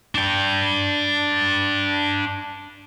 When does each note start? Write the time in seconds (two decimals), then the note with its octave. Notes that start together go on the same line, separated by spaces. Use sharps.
0.15 D4 G5